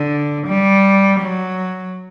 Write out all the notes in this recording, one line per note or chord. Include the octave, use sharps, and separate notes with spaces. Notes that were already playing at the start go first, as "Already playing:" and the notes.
Already playing: D3
G3
F#3